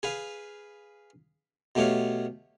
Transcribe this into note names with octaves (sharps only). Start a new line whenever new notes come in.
G#4 B4 F5
B2 A3 G4 C#5 F5